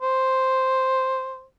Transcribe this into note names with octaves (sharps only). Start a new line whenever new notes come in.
C5